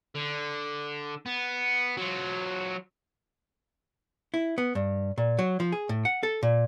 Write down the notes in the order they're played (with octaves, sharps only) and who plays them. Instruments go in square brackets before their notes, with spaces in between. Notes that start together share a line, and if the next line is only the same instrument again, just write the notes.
[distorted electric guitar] D3
B3
F#3 F4
[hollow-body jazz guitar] E4
B3
G2
A#2
F#3
F3
G#4
A2
F#5
A4
A#2